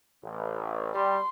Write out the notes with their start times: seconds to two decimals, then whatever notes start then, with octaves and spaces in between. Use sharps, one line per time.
0.23 A1
0.95 G3 C6